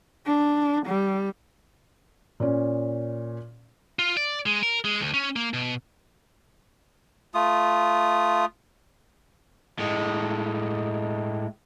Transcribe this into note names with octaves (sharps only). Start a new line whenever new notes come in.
D4
G3
A#2 C#4
F4
D5
G#3
A#4
G#3
D2
C#4
A#3
B2
A3 F4 D#6
A2 G#3